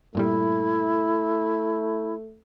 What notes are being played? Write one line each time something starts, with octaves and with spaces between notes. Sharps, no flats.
G2 A#2 G3 A3 E4